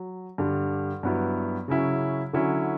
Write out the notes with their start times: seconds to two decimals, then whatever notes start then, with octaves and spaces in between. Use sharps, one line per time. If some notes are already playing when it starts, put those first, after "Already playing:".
Already playing: F#3
0.38 G2 D3 G3
1.03 G2 F#3 B3 E4
1.68 C#3 F#3 C#4 E4
2.33 D3 F#3 C#4 E4